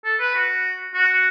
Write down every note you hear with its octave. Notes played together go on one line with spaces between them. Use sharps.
A4
B4
F#4
F#4